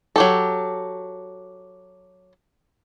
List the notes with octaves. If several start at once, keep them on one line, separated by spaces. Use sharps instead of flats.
F#3 G4 A4